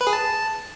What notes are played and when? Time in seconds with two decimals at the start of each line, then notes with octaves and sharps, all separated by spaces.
0.01 B4
0.07 G#4
0.13 A5